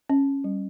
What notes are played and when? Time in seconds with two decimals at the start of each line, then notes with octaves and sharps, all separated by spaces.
0.09 C#4
0.44 G3